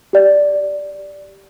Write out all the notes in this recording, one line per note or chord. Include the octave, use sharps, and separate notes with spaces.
G4 D5